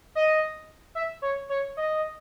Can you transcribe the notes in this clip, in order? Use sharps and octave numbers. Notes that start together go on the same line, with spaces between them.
D#5
E5
C#5
C#5
D#5